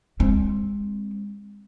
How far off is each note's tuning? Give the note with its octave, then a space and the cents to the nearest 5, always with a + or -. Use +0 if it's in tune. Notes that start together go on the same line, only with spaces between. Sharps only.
G#3 -30 C4 +10